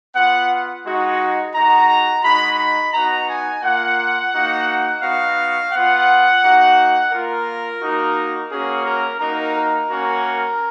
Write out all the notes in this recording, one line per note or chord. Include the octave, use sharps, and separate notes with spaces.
B3 F4 F#5
G#3 D#4 F#4
G#3 D#4 F#4 A#5
A#5
G#3 D#4 F#4 B5
B5
B3 D#4 F#4 A#5
G#5
A#3 F4 F#5
A#3 D#4 F#4
B3 D#4 F#4 F5
B3 F4 F#5
A#3 D#4 F#4
A#3 F4 A#4
A#3 D#4 F#4
A#3 C#4 F#4 G#4
A#4
A#3 D#4 F#4 A#4
A#4
A#3 C#4 F#4